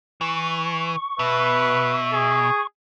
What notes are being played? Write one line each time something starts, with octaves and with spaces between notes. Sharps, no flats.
E3 C#6
B2 B4 E5
G#4